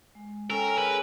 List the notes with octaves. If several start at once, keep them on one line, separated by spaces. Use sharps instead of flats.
G#3
C#4 A4 A#4 C#5 G5 E6
G#4 A#4 B4